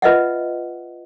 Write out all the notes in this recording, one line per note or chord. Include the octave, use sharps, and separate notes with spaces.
F4 B4 D#5 E5 F#5